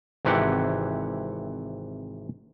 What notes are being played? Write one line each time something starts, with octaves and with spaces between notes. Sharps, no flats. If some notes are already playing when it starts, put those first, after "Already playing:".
G#1 C3 E3 G4 F#5